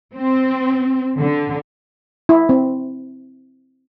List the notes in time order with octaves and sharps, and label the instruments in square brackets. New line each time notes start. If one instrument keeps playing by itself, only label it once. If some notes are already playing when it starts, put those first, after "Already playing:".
[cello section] C4
D3
[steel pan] E4
C4